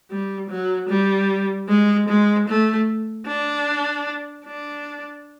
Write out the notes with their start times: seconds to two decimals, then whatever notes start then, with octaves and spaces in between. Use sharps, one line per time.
0.11 G3
0.50 F#3
0.89 G3
1.69 G#3
2.08 G#3
2.48 A3
3.27 D4
4.46 D4